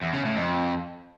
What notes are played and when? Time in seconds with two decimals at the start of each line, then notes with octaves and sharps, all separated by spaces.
0.03 E2
0.14 C#3
0.25 A2
0.36 F2